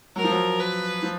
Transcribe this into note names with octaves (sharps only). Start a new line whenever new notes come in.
F#3 A#4
F3
F#3
B4
F3